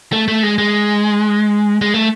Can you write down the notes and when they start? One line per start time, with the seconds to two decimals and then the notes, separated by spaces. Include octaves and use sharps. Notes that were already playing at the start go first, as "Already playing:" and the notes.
0.13 A3
0.28 A3
0.43 G#3
0.58 G#3
1.81 G#3
1.94 A3